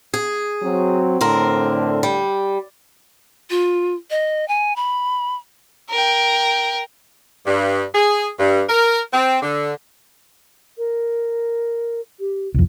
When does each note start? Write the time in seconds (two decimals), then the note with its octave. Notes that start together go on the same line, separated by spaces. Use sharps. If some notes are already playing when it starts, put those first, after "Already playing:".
0.14 G#4
0.62 F#3 C4
1.21 A2 D3 C4 A#4
2.03 G3
3.50 F4
4.10 D#5
4.48 G#5
4.76 B5
5.91 A#4 G5
7.46 G2
7.95 G#4
8.39 G2
8.69 A#4
9.12 C4
9.43 D3
10.78 A#4
12.20 G4
12.54 C2 F2